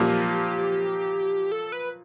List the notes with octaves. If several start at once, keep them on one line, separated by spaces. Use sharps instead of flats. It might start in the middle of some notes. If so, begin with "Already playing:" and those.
Already playing: A#2 F3 A#3 G4
A4
B4